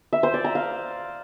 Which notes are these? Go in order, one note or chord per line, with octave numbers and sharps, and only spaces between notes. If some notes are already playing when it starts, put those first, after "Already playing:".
E5
C5
D5
A#5
F5